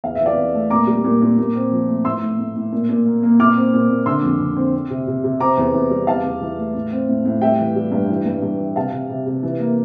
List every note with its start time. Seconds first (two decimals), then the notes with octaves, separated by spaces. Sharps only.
0.04 E2 F5
0.15 E5
0.21 E3
0.26 D5 F5
0.37 E2
0.54 A3
0.70 A#2 A#5 D6
0.87 G3
1.04 A#2
1.21 A#2
1.38 A#2
1.55 C4
1.71 F3
1.88 A3
2.05 A2 C6 E6
2.22 A2
2.38 A2
2.56 A2
2.72 A#2
2.89 A#2
3.06 A#3
3.23 A#3
3.39 A#2 D6 F6
3.56 C4
3.73 A#2
3.89 A#2
4.06 D3 C6 E6
4.23 F2
4.40 D3
4.57 C4
4.74 C4
4.90 C3
5.07 C3
5.24 C3
5.40 C4 A#5 D6
5.57 E2
5.74 E2
5.90 G3
6.07 E2 F5 A5
6.25 E2
6.41 E3
6.58 A3
6.74 A2
6.92 C4
7.09 A2
7.25 A2
7.41 G3 E5 G5
7.59 E3
7.76 G3
7.92 G2
8.10 E3
8.26 G2
8.42 G2
8.60 E3
8.76 C3 F5 A5
8.92 C3
9.10 C3
9.26 C3
9.43 E3
9.60 A#3